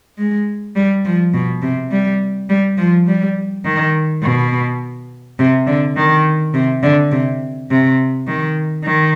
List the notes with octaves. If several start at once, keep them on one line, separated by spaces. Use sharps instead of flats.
G#3
G3
F3
B2
C3
G3
G3
F3
G3
D#3
B2
C3
D3
D#3
C3
D3
C3
C3
D#3
D#3